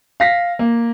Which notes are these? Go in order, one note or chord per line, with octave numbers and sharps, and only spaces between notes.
F5 A#6 B6
A#3